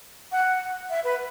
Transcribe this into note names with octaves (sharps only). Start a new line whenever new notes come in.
F#5
E5
B4